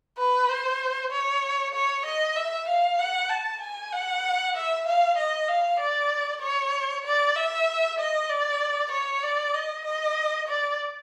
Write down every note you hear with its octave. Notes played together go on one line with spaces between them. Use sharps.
B4
C5
C#5
C#5
D#5
E5
F5
F#5
A5
G#5
F#5
E5
F5
D#5
F5
D5
C#5
D5
E5
D#5
D5
C#5
D5
D#5
D#5
D5